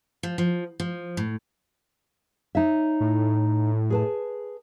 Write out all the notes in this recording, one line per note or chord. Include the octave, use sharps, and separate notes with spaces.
F3
F3
F3
A2
D#4 C#5 E5
A2
G#4 B4 A5